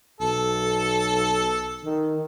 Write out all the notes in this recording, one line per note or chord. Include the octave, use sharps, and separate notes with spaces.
B1 A4
D#3